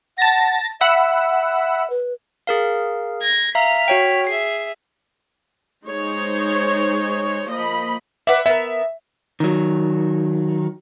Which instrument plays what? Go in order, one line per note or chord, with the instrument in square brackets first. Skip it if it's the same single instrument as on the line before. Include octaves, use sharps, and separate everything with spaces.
[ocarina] F#5 [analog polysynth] A5 A6 A#6
[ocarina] E5 [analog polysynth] F#5 B5 E6
[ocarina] B4
[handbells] G#4 A#4 F5
[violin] G#6 A#6
[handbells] E5 F5 A#5 [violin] F6 B6
[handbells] F#4 C#5 G5
[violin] G#4 E5 [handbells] C7
[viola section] G#3 D#4 C5 C#5
F3 A#3 D#5 B5
[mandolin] B4 D5 [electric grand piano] E5 F#5
[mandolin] B3 A#4 [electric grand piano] E5
[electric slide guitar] D#3 F#3